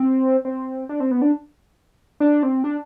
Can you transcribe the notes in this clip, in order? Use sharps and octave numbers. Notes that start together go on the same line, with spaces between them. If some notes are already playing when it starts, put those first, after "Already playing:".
Already playing: C4
C4
D4
C4
B3
D4
D4
C4
D4